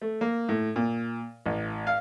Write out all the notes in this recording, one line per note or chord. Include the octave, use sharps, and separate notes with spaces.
A3
A#3
A2
A#2
A1
F5